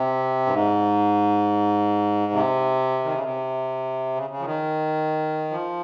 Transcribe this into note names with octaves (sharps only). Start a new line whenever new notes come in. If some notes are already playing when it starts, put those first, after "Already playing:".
Already playing: C3
G2
G#2
C3
D#3
C#3
C3
C#3
C#3
F3
D#3
F3